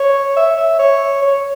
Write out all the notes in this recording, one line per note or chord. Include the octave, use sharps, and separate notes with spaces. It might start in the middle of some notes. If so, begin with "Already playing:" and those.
Already playing: C#5
E5
E5
C#5
C#5